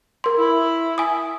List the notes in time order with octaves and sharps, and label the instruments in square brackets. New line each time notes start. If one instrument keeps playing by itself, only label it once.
[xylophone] A#4 C6
[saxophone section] E4
[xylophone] G#5 D#6